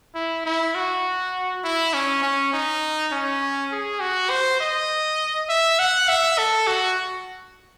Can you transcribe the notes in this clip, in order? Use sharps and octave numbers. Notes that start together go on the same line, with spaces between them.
E4
E4
F#4
E4
C#4
C#4
D#4
C#4
G#4
F#4
C5
D#5
E5
F#5
E5
A4
F#4